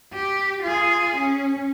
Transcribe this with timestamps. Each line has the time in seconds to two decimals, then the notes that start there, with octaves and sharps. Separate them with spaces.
0.14 G4
0.63 F4 G#4
1.16 C#4